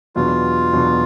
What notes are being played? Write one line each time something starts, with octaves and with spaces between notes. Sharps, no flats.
E2 B2 F#3 B3 D4 F4
E2 B2 F#3 B3 D4